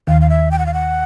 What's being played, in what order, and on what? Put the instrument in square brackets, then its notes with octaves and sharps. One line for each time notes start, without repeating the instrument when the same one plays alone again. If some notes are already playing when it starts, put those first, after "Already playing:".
[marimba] D#2 D#3 [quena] F5
[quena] F5
E5
G5
F#5
F5
F#5